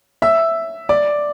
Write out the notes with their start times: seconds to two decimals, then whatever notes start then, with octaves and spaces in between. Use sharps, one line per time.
0.22 E5 E6
0.89 D5 D6